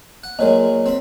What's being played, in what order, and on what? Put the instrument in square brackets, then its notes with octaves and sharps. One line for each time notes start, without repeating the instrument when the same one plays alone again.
[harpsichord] F#5
[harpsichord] A#2 F#3 G#3 [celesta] A#4 C#5 D#5
[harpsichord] C4 B5